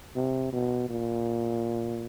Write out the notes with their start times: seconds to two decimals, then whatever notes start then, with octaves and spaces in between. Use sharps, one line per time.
0.16 C3
0.52 B2
0.89 A#2